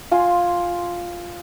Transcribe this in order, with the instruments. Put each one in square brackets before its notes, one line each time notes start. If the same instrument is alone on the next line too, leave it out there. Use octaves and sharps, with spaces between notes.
[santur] F4 G#5 C6